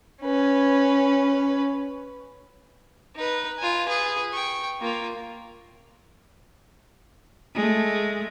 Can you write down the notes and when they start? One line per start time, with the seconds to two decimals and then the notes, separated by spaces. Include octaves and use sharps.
0.21 C#4 B4
3.15 D#4 B4
3.58 F4 G#5
3.87 G#4 B4
4.33 G5 C#6
4.81 A#3 F4
7.55 G#3 A3